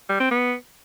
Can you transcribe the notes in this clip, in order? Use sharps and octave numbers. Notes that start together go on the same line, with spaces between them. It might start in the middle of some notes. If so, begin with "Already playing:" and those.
G3
C4
B3